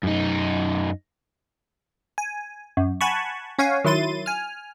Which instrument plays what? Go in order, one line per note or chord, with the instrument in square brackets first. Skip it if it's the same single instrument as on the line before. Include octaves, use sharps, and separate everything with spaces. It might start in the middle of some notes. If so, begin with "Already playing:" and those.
[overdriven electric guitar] F#2 D#4
[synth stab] G#5
F#2
F#5 G#5 A5 B5 C#6
C#4 C#5 F5 F#5 G#5
D#3 F#3 E4 C6 A6 D#7
G#5 F6